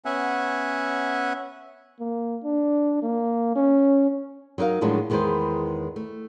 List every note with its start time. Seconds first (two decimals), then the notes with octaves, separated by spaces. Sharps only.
0.05 B3 C#4 E5 F#5 G#5
2.00 A#3
2.44 D4
3.03 A#3
3.55 C#4
4.58 F#3 D#4 A#4 F5
4.81 A2 D#3 F3 F#3 G#3 D4
5.10 E2 D#3 G#3 E4 B4 C5
5.96 A3